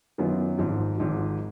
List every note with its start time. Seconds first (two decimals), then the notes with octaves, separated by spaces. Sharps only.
0.18 F#2 D#3 F#3 B3 F4
0.59 G#1 G#2 F3
0.97 G#1 G#2 F3